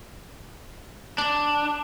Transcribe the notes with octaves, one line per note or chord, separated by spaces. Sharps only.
D4